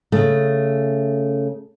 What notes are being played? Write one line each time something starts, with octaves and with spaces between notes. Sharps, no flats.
C#3 A3